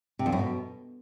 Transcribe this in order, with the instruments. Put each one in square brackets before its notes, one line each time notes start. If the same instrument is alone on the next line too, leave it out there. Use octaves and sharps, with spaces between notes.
[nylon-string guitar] C3
F2
F#2
B2